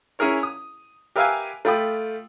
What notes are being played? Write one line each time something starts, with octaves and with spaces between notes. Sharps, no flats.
C#4 E4 G#4 A#4 C#5
D#6
G4 A#4 B4 E5 F5 G#5
A3 F4 G5 B5 D#6